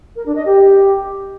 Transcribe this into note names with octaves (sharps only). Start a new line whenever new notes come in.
A#4
D4
D#5
G4